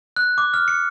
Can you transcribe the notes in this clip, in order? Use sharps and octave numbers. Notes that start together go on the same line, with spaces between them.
F#6
D6
F6
C#7